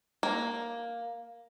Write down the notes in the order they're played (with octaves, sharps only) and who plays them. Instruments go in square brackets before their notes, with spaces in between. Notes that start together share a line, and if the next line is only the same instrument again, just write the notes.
[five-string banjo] A#3